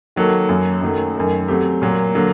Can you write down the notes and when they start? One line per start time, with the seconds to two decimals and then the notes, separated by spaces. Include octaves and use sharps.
0.16 D#3 F#3 A#3 F#4 A4
0.49 F#2 F#3 A#3
0.82 F#2 D#3 F#3 A3
1.15 F#2 D#3 A3
1.48 F#3 A3 C4 G4
1.82 A#2 F#3 A#3
2.15 D3 F#3 A#3